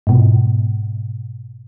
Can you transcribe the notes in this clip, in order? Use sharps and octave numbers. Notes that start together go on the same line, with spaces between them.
G#2 B2